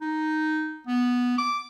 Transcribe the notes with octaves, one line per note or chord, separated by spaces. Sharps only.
D#4
B3
D6